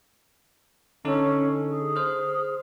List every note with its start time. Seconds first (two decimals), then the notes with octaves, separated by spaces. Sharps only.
1.05 D3 C#4 D#4 A4
1.69 G#4
1.96 C5 F6